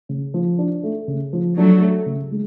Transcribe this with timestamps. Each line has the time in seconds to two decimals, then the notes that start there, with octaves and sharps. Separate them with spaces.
0.09 C#3
0.34 F3
0.59 D4
0.84 A3
1.08 C#3
1.33 F3
1.57 F#3 A3 D4
1.82 A3
2.06 C#3
2.31 G#3